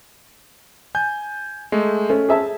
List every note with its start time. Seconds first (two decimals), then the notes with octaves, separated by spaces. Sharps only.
0.95 G#5 G6
1.72 G#3 A3
2.10 A3 C#4
2.29 G#4 E5 A5